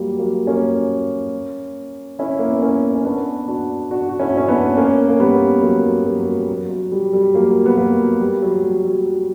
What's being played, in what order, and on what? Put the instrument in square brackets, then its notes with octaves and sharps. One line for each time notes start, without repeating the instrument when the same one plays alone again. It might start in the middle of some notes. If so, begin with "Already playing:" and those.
Already playing: [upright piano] F#3 G3 A#3
F#3 A#3
A#3 C#4
C#4 E4
A#3
B3
A#3 C#4
C#4
B3 D4
D4 F#4
D4 F#4
F#4
C#4 E4
C#4
B3 D4
A#3 C#4
A#3
G3 B3
F#3 A#3
G3
F#3 A#3
G3
F#3
F#3
G3
G3
F#3 A#3
B3
F#3 A#3
G3
F#3
G3
F#3